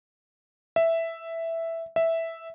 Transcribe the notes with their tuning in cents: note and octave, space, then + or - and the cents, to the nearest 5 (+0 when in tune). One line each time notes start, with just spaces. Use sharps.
E5 +0
E5 -5